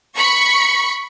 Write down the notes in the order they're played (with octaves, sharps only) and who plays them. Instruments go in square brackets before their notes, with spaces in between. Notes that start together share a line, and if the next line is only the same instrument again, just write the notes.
[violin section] B5 C#6 C#7